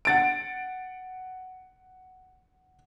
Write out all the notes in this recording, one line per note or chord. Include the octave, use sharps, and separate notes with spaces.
F#5 A6 D7